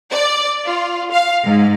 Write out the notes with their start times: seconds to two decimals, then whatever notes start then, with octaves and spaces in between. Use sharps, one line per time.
0.12 D5
0.66 F4
1.12 F5
1.44 G#2